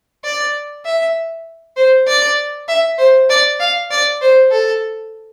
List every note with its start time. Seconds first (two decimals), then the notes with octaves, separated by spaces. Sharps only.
0.24 D5
0.85 E5
1.76 C5
2.08 D5
2.68 E5
2.98 C5
3.30 D5
3.60 F5
3.91 D5
4.21 C5
4.51 A4